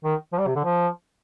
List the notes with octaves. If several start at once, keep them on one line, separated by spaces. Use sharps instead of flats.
D#3
F3
G3
C3
D3
F3